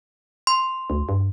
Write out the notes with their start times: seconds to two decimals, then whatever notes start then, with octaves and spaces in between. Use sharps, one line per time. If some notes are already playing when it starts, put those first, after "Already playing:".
0.47 C6
0.90 D2
1.09 G2